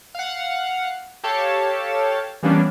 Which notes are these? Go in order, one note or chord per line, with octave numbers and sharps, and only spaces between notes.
F5 F#5
G4 A4 C#5 F5 A5
E3 G3 A#3 B3 C#4 D4